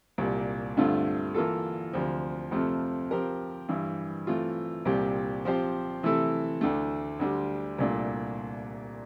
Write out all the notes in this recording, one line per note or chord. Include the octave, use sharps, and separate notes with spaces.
C2 A#2 G3
G2 D3 A3 C4 F4
E3 A#3 F4 A4
D2 C3 F3
F2 C3 F3 A3 C4
F3 C4 G4 A#4
G2 E3 G3
E3 A3 C4 F4
C2 A#2 G3 C4 G4
F3 C4 G4 C5
C3 E3 A3 E4 A4
D2 D3 A3
D2 D3 G3
C2 A#2 A3 D4